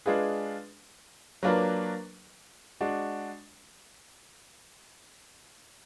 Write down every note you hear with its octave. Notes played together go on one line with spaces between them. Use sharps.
G#3 D4 F4 G#4 B4
F#3 A#3 D4 F4 B4
G#3 D4 F#4